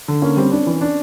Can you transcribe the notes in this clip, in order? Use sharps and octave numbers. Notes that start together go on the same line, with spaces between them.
D3
A#3 C#4
G3 C4
C4 D4
E3
D4